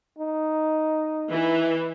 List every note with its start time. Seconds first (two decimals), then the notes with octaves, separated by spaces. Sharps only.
0.19 D#4
1.31 E3